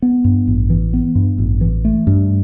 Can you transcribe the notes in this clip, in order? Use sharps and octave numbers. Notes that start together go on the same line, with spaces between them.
B3
G2
A1
E3
B3
G2
A1
E3
A3
G2